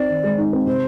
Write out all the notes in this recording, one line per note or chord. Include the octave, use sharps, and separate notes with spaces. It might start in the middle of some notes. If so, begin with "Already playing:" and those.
Already playing: C4 D#4 D5
D#3
G#3
D#4
C4
C3 C5